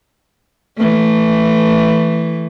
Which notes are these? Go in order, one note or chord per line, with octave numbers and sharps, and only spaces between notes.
E3 A3